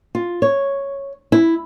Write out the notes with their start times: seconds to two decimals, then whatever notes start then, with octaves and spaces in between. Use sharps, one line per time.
0.15 F4
0.42 C#5
1.32 E4